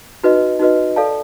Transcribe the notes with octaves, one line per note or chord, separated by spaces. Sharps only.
D#4 F#4 B4 D#5
D#4 F#4 B4 D#5
A4 D5 F5 A5